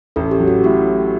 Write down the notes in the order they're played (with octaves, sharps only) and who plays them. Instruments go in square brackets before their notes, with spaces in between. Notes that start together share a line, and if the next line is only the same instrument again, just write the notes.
[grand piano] A1 [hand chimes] A4
[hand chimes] G4
[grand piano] F#3
[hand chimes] F#4
[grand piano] A2 [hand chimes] G4